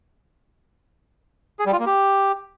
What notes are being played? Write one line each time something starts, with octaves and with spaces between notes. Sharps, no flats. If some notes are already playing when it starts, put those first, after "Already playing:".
G#4
G3
F4
A#3
G4